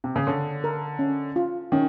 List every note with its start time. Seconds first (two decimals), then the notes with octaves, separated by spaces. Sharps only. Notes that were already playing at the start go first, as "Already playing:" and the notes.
0.04 C3
0.16 C#3
0.27 D3 C#5
0.64 A#4
0.99 C#4
1.36 F4
1.72 D#3 C#4